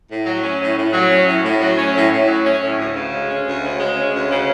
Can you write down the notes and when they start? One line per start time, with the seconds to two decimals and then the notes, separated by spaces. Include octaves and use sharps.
0.09 A2
0.26 F#3
0.43 C#4
0.60 A2
0.77 A2
0.93 F#3
1.10 C#4
1.27 A2
1.43 A2
1.60 F#3
1.77 C#4
1.95 A2
2.11 A2
2.27 F#3
2.44 C#4
2.61 A2
2.78 D2
2.95 C#3
3.12 G#3
3.28 C#4
3.45 D2
3.62 C#3
3.79 G#3
3.96 C#4
4.13 D2
4.30 C#3